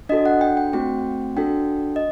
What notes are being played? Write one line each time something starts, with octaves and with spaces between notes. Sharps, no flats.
D4 F#4 A4 D#5
F#5
G5
G5
A3 C4 F#4 G5
D4 F#4 A4 G5
D#5